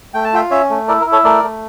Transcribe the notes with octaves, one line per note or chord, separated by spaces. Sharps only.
A3 G5
A5
F4 E5 G5
C#4 C#5 E5
A3
E4 A#4 D5
A#4
E4
A4 C#5
A3 A#4 D5
A3